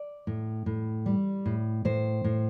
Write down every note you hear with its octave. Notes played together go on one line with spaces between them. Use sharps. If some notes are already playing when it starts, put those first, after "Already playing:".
Already playing: D5
A2
A2
G3
A2
A2 C5
A2